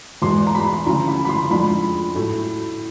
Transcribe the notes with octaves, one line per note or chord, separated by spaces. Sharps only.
E2 B2 G#3 C6
A#5
B5
D2 C#3 F3 A#5
B5
B5
C6
F2 D3 F3 G#3 B5
A2 F#3 A3